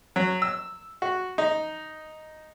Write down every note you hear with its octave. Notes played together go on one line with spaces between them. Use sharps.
F#3
E6
F#4
D#4